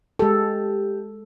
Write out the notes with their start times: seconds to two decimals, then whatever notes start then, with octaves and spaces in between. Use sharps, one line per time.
0.19 G#3 G4 A4